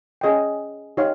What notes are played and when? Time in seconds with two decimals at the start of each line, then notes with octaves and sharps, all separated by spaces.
0.21 C#4 G#4 D#5 G5
0.97 D#4 G4 C#5 F5